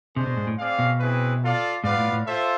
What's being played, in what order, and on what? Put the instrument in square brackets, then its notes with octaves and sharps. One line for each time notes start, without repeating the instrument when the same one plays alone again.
[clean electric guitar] C3 [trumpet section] G#3 D4 G#4 C5
[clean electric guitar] B2
G#2
A2
[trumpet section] C4 G#4 D5 F5
[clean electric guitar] B2
[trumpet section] C4 E4 G#4 B4
F4 A4 D5 F5
[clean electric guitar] G#2 [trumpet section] B3 F4 B4 D5 F5
[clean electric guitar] A2
A2
[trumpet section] F4 A4 C5 E5